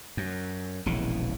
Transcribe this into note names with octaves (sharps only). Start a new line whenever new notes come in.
F#2
E1 A#1 C#3 E3